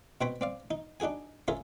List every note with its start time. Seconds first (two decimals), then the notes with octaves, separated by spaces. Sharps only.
0.21 B2 C4 C5 C#5 G5 B5
0.41 C4 D5 F5
0.71 D#4
1.00 D4 D#4 F#4 G#4 G#5
1.48 C#4 F4 G#4 A#4 E5